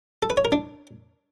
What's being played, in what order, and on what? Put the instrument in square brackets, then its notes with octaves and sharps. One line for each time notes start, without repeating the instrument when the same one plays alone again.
[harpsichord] A4
B4
C#5
A#4
D4